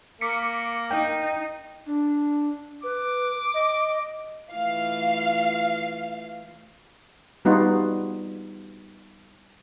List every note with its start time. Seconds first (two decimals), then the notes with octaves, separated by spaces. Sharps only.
0.21 A#3 D6 B6 C#7
0.91 D#4 G5
1.86 D4
2.83 B4 D6
3.54 D#5
4.52 E3 A3 F4 F5
7.45 G3 B3 D#4 F4 F#4